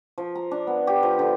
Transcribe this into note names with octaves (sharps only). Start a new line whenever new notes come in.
F3
A#5
D4
B3
G4
F3
D3